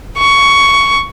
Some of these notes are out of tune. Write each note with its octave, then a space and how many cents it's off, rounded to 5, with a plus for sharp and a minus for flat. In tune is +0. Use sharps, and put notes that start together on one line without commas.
C#6 +10